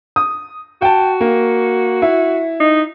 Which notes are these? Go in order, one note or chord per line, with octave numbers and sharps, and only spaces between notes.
D#6
F#4 G5 A5
A#3
E4
D#4